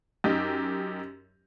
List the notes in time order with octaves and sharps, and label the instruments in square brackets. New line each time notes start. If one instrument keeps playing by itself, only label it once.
[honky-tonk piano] F#2 D#4 G4